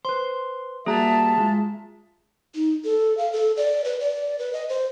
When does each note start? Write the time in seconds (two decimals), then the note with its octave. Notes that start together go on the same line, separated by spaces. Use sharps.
0.05 B4 C5 C6
0.86 G3 A#3 F#4 G#4 E5 A5 A#5
1.38 G#3 F4
2.55 D#4
2.84 A4
3.18 F5
3.33 A4
3.57 D5
3.84 B4
4.00 D5
4.39 B4
4.53 D#5
4.69 C5